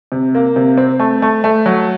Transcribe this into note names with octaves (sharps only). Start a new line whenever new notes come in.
C3
A#3
C3
C4
A3
A3
A3
F#3